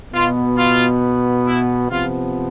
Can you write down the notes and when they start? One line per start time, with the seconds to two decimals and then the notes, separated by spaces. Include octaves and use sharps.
0.13 B2 B3 F4
0.57 F4
1.46 E4
1.90 C3 F3 B3 F4